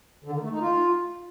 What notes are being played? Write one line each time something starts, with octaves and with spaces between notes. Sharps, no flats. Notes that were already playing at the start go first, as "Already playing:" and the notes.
D3
D#3
A3
D#4
F4